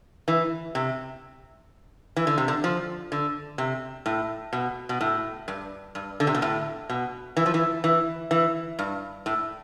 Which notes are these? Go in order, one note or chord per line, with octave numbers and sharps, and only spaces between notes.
E3
C3
E3
D3
C3
D3
F3
D3
C3
A2
B2
B2
A2
G2
G2
D3
C3
B2
A2
B2
E3
F3
E3
E3
E3
G2
A2